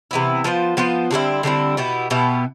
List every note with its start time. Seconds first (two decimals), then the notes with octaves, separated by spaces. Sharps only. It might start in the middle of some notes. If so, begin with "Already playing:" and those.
0.11 C3 E3 B3 E4
0.44 F3 B3 F4 C5
0.77 F3 B3 F4 C5
1.11 D3 G3 C4 E4
1.43 D3 G3 C4 E4
1.77 B2 B3 E4 G4
2.10 B2 B3 E4 G4